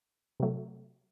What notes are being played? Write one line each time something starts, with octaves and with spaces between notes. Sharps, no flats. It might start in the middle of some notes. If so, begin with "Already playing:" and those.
C3 F#3 A3